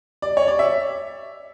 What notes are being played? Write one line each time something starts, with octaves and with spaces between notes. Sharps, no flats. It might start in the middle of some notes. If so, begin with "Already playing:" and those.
D5
C#5
D5
E5